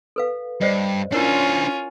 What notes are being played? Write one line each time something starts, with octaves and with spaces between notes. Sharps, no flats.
A4 B4 F5
G2 C5 D5 D#5
C#4 D4 E4 F4 A#4 C5 C#5